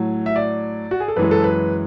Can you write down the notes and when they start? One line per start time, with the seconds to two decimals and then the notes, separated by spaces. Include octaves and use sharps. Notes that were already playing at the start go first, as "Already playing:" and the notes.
Already playing: A2 F#3
0.26 E5
0.36 D5
0.91 F#4
1.00 G#4
1.08 A4
1.16 F#2 E3 G#3 B4
1.31 A4
1.44 B4